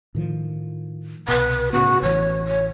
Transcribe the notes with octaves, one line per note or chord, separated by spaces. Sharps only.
A2 D#3 F3
C2 B2 B4
A2 C#3 B3 F#4
A1 E3 C#5
C#5